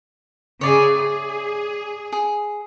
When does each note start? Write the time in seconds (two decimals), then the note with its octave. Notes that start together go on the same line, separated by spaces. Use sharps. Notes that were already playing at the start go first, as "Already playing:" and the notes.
0.61 C#3 G#4 C#5 D5 E5
0.96 G#4
2.12 G#4